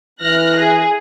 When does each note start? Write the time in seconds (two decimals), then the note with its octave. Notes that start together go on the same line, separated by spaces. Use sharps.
0.22 E3 F6 F#6 A#6
0.58 G#4